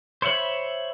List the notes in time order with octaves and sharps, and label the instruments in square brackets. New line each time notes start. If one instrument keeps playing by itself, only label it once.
[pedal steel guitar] C5 C#5 E5 B5